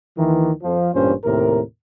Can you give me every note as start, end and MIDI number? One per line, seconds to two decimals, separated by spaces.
0.18 0.50 39
0.18 0.50 51
0.18 0.50 52
0.63 0.90 41
0.63 0.90 53
0.95 1.13 33
0.95 1.13 43
0.95 1.13 46
0.95 1.13 61
0.95 1.13 72
1.24 1.61 39
1.24 1.61 45
1.24 1.61 48
1.24 1.61 70